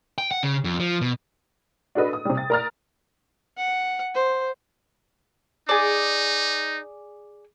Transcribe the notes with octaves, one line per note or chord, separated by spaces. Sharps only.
G5
F#5
C#3
F2
F3
B2
D4 F#4 A4 B4 D#5
D#6
C3 G3
A6
A#4 D5 A#5 D#6 F6 A6
F#5
C5
D#4 G#4 D5